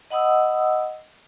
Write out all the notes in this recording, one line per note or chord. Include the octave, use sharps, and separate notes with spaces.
D#5 F#5 B5 D#6 E6